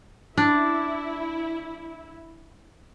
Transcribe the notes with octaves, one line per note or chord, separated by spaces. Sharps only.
D4 E4